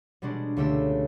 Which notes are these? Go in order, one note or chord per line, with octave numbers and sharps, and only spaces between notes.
B2 G3 G#3 D4 F#4
C#2 D3 A3 G4 E6